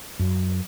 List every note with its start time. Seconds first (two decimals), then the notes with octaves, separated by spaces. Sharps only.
0.19 F#2